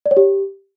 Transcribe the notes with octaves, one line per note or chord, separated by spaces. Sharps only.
D5
C#5
G4